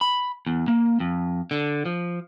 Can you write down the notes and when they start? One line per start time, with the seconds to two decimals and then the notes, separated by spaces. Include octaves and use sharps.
0.01 B5
0.47 E2
0.68 A#3
1.00 F2
1.51 D3
1.86 F3